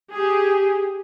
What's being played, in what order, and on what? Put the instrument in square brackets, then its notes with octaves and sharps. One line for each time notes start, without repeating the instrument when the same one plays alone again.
[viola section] G4 G#4